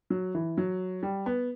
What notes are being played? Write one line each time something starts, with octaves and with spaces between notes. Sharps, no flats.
F#3
E3
F#3
G3
B3